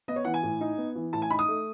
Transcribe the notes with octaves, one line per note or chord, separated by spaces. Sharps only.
B3 D#5
C#5
E3 F#5
G#5
A2
D#4
B3
E3
A2 A5
G#5
D#4 B5
D#6
A3